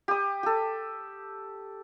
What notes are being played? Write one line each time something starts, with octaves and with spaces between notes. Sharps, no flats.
G4 D#6
G4 A4